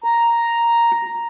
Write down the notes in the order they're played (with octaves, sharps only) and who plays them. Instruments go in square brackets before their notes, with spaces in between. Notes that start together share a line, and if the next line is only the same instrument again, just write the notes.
[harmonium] A#5